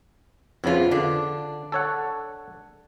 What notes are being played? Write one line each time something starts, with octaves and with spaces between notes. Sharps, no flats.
F2 C#3 F3 B3 F4
D3 D4
A4 C#5 F#5